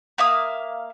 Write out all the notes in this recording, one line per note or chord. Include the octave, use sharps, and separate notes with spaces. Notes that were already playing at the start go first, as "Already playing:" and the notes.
A#3 E5 F5 D#6